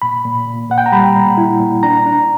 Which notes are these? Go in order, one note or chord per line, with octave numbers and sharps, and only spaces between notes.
A#2 B5
A#2
A#2
A#2 F#5
G5
A#5
G3 B5
A#2
E4
A#2
D4 A#5
D4